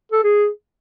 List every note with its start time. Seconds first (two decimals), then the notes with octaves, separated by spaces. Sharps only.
0.12 A4
0.23 G#4